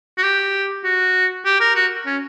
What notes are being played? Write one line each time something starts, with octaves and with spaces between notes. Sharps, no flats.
F#4
G4
F#4
G4
A#4
F#4
C#4